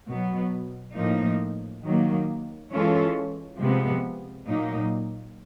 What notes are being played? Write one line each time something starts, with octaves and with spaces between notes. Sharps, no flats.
B2 F#3 B3
A2 F3 A#3 D#4
D#3 F#3 A#3
E3 G#3 C#4 F4 A4
C3 F3 G#3 B3
A#2 F#3 A#3 D#4